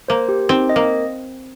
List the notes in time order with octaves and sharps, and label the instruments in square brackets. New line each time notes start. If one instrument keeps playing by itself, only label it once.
[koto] A#3 [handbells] C5
[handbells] G4
[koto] C4 [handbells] D#4
[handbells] D#5
[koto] A#3